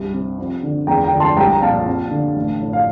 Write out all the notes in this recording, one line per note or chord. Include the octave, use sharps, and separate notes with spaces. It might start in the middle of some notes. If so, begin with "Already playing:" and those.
Already playing: C2 G2
C3
F2
D3
E2 G5 A#5
G5 A#5
D3
A5 C6
C2 G5 A#5
A#5
A#2 F5 A5
F2
D3
A1
A2
F5